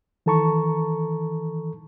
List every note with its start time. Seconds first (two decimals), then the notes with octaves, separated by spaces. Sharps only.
0.26 D#3 E3 A4 A5 A#5 C#6